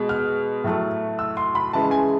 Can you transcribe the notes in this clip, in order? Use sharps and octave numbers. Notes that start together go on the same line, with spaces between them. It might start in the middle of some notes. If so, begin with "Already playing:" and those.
Already playing: B2 G#3
F6
A2 F#3 A3
E6
C6
B5
C#3 E3 G#3 A5
G#5